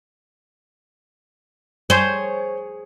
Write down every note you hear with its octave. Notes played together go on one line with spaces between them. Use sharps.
G#4 C5 C#5